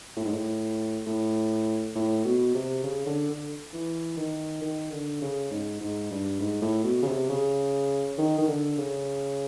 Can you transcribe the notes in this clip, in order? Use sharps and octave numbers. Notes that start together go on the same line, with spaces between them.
A2
G#2
A2
A2
A2
B2
C3
C#3
D3
D3
E3
D#3
D#3
D3
C#3
G#2
G#2
G2
G#2
A2
B2
C#3
C3
C#3
D#3
D#3
D3
C#3